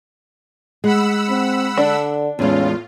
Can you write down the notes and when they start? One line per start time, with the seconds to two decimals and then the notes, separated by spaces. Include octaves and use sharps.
0.84 G#3 F#5 B5 E6
1.29 C4
1.78 D3 D4
2.39 E2 A2 G#3 C#4 F4